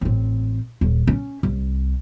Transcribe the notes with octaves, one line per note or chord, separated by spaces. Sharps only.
A1 C4
D#1
C#4
C2